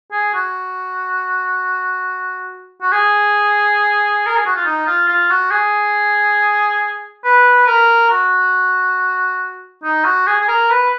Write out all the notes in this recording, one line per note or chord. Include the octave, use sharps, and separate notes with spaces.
G#4
F#4
F#4
G#4
A#4
G#4
F#4
F4
D#4
F4
F4
F#4
G#4
B4
A#4
F#4
D#4
F#4
G#4
G#4
A#4
B4